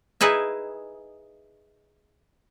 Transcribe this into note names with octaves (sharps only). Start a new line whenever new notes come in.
D#4 E4 G#4 B4 E5